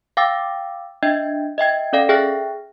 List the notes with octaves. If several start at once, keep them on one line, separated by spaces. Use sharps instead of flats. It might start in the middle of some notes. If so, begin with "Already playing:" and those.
F5 G5 D6 E6 A6
D4 D#5 E5 G5 G6 G#6
D#5 E5 G5 G#6
C#4 A4 D5 F5 G5
G#4 E5 G5 F6 F#6 A#6